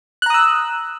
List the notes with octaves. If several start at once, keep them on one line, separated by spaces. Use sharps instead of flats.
A#5 D#6 E6 F#6